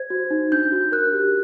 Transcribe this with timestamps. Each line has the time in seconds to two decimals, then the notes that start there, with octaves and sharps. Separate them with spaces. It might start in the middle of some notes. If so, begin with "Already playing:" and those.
Already playing: C5 G#6
0.10 F#4
0.31 D#4
0.52 D4 G6
0.72 F#4
0.92 A#4 F#6
1.13 G4